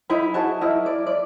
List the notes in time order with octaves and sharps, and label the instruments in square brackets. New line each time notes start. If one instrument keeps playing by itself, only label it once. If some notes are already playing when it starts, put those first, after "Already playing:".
[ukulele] D#4 E4 E5 B5
F#4 G#4 C5 A5
E4 A#4 D#5 E5
D5
D5